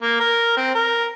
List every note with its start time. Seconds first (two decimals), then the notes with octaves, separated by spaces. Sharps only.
0.03 A#3
0.20 A#4
0.57 C4
0.75 A#4